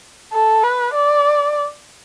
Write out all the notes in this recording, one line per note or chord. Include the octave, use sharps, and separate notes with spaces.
A4
B4
D5